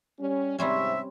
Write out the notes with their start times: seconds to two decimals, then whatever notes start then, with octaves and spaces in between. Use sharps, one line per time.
0.19 G3 C#4
0.59 G#2 C3 G3 C4 C#4 E5